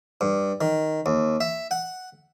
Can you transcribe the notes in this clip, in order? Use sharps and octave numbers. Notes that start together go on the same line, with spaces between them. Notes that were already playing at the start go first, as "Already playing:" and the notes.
G2
D#3
D#2
E5
F#5